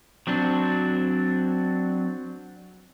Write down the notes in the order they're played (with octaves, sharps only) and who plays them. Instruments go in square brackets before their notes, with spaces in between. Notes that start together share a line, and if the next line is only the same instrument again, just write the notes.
[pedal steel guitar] F#3 C4 D4